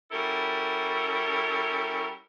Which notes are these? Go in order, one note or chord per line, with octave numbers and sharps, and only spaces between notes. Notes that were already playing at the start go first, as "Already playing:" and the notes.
G3 C#4 E4 F#4 A4 A#4